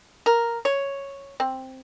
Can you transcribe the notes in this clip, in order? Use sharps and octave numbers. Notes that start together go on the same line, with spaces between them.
A#4
C#5
C4